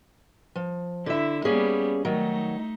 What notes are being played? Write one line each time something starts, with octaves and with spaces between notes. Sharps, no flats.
F3
D3 E4 E5
G3 A#3 B3 C#4 G#4
D#3 F#3 A3 D#4